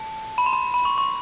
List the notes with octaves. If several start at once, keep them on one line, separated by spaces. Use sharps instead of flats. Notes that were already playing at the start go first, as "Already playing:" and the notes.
Already playing: A5
B5
C6
B5
B5
C#6
C#6